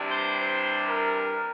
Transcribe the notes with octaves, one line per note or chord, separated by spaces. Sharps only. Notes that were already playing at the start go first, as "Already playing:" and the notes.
Already playing: C3 E3 G3 D4
C5
C5
A#4